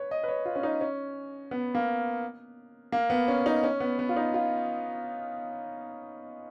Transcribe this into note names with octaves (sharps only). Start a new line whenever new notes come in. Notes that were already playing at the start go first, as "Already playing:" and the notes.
Already playing: B4 C#5
D#5
B4
C#5
F4
C#4
D#4
C#4
B3
A#3
A#3
B3
C#4
D#4
C#4
B3
B3
F4
D#4
F4